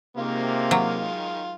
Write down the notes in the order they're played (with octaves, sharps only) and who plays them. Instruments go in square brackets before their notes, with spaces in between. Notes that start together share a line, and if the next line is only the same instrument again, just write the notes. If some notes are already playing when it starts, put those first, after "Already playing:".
[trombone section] C3 A#3 [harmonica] D#3 G#3 F4
[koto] F#3